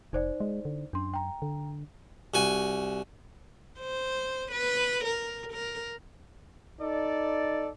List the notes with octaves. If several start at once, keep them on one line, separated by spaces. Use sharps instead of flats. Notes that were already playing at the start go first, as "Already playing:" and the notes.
F1 D#4 C5 D5
G#3
D3
F#2 D4 C6
G5 A#5
D3
C2 F#4 G#5
C5
B4
A#4
A#4
D#4 A4 D5